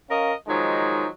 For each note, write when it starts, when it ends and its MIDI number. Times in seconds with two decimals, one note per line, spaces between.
0.10 0.33 61
0.10 0.33 70
0.10 0.33 75
0.10 0.33 77
0.48 1.07 51
0.48 1.07 53
0.48 1.07 54
0.48 1.07 56
0.48 1.07 63